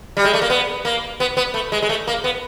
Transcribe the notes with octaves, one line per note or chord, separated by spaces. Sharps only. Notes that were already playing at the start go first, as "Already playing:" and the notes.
G3
G#3
A3
A#3
B3
A#3
B3
B3
A3
G#3
G#3
A3
A#3
B3